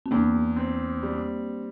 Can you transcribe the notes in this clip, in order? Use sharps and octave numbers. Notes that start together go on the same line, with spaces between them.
C4
E2 A#3 D4
C4
G3